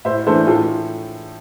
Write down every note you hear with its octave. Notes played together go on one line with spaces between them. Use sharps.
A2 C5 E5
E3 A3 D4 A4 C5
A2 F4 A4